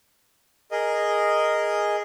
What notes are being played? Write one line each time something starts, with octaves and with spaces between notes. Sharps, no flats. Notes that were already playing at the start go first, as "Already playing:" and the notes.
G#4 A#4 D#5